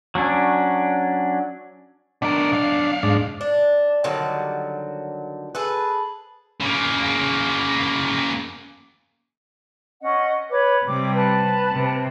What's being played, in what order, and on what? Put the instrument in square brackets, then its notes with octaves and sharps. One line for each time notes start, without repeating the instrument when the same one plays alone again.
[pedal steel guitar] F#3 C#4 D4
[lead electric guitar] B2 A#4 [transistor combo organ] D4
[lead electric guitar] B1 F5
[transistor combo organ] G#2 D4
[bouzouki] D4
D3 D#3 F#3 G3
G#4 A4 B4
[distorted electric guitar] C#3 A#3
[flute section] C#4 D#5 F#5
B4 C#5 D6
[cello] C3 G3 [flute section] D6
[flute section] B4 A5
[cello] C3